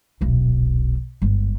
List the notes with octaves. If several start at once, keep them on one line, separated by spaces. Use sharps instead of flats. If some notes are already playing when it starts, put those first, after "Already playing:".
D#1 B1
G1 G#2